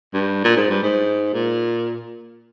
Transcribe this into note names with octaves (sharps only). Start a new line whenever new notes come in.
G2
A#2
G#2
G2
G#2
A#2